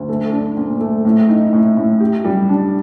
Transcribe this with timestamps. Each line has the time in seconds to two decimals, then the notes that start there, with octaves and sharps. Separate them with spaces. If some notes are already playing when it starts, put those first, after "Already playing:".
Already playing: D2
0.09 A3
0.32 D4
0.57 A#2
0.80 A3
1.05 A2
1.29 D#4
1.53 A2
1.77 A2
2.00 G4
2.25 G3
2.49 D4